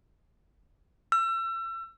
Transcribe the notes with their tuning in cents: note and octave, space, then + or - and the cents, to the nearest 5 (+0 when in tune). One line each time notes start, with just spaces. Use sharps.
E6 +35